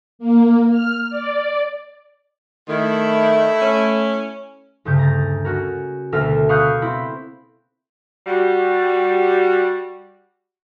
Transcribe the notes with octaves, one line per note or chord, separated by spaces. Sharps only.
A#3
F6
D5
D#3 A3 E4
C#4
D2 G2 C#3 G6
A#5 A6
C#4 F#4 A#4
D2 B2 A4 A#4 E5 F6
F5 B5 C#6 D#6 F#6 G6
C4 E4 B5
G3 F#4